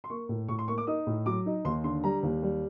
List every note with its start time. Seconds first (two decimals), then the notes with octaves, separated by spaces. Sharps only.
0.04 C6
0.10 A#3 C#6
0.29 A2
0.48 A2 C#6
0.59 C6
0.68 A#3 C#6
0.78 D6
0.87 D#4 D#6
1.07 A2
1.26 F#3 D6
1.46 D#4
1.65 D#2 C6
1.84 D3 C6
2.04 G3 A#5
2.23 D#2
2.43 G3